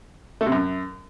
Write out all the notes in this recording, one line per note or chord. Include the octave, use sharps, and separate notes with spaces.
A3
C3
F#2